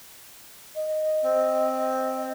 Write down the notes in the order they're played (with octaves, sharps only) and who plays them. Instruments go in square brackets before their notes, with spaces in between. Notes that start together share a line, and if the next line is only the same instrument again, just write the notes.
[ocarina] D#5
[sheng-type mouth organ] C4